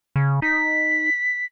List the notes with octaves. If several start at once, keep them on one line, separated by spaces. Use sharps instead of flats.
C#3
D#4 B6